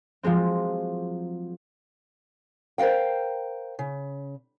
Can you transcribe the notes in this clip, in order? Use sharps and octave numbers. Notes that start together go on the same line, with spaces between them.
F3 F#3 G#3 C4
A#4 C5 D#5 F5 G5
C#3